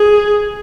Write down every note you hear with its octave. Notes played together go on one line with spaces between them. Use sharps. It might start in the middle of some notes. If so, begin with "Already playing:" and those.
Already playing: G#4